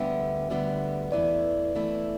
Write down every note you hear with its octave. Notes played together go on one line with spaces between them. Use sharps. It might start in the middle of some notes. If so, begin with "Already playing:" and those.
Already playing: D2 D3 G3 B3 G4 E5
D2 D3 G3 B3 G4
E2 E3 A3 E4 D5
E2 E3 A3 E4